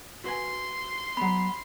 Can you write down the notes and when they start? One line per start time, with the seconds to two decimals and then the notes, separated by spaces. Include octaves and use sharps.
0.24 F#4 B4 G#5 C6
1.17 F#3 B3 B5